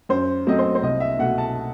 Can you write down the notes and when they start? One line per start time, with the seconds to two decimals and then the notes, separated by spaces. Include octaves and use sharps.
0.09 F#2 C5
0.47 F#3 A3 C4 D#5
0.59 C5
0.75 C5
0.83 C2 D#5
1.00 E5
1.19 B2 A3 F#5
1.38 A5